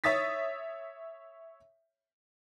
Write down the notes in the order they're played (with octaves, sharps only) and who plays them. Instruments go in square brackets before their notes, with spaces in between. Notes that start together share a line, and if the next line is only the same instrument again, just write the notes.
[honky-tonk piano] C#5 E5 D#6 A6 B6